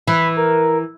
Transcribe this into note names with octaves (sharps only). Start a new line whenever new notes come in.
E3 B5
A#4